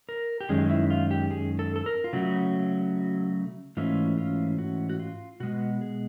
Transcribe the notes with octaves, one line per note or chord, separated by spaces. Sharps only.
A#4
G4
F#2 D#3 G#3 C#4 G#4
E4
F4
G4
G#4
A4
A4
A#4
F4
C#3 F#3 A3 F#4
G#2 E3 A3 C#4 F4
F4
F#4
F#4
F4
B2 G#3 B3 F#4
G#4